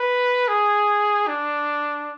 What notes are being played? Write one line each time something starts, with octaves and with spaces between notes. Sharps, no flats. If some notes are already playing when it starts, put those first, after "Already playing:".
Already playing: B4
G#4
D4